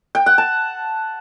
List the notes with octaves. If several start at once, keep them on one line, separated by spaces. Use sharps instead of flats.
G5
F#5
A5